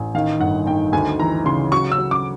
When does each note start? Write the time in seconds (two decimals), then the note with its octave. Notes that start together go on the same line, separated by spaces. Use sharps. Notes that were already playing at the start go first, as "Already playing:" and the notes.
Already playing: A1
0.15 D#3 F5
0.40 G1 F#5
0.66 D#3 G5
0.93 D2 G#5
1.19 E3 A#5
1.45 C#3 C6
1.72 F#3 C#6
1.92 E6
1.98 F#3
2.11 D6